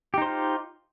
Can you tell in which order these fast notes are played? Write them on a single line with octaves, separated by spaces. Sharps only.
G4 D#4 C5 F4